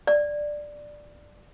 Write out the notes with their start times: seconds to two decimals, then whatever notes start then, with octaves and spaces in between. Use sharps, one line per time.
0.07 D5